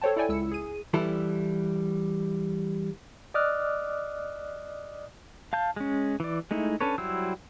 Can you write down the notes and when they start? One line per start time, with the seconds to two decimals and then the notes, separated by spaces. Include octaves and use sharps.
0.01 A4 C5 C#5 G5 A5
0.16 E4 A4 C#5 D5 G5 G#5
0.29 C#2 E4 E6 C#7
0.51 G#4 D#7
0.94 E3 G3 E4 A4
3.34 D5 D#5 D6 D#6 F6 F#6
5.53 F5 A5 G6
5.76 G#3 C#4
6.20 E3 D5
6.51 G#3 A3 D#4 E4
6.81 C#4 D4 A4 B4 C#5
6.98 F#3 G3 E4 C5 E6